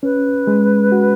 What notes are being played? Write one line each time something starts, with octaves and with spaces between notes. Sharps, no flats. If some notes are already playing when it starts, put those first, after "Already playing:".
C#4 B4
G#3
F#4